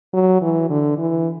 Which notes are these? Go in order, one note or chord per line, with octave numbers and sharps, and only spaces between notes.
F#3
E3
D3
E3